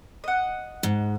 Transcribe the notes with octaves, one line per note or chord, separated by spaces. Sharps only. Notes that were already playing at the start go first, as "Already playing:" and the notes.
D#5 F#5
G#2